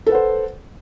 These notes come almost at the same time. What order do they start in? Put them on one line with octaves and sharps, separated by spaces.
A4 B4 F#5 C5